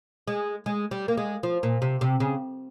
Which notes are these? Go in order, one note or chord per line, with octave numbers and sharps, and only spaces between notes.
G#3
G#3
G3
A#3
G#3
F3
A#2
C3
C3
C#3